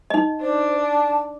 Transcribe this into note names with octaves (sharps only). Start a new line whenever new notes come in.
D#4 D#5
D4 C5
A5